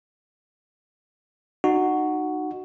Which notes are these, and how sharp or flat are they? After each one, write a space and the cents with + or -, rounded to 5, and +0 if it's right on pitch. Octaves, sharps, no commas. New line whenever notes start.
D#4 -30 F#4 +0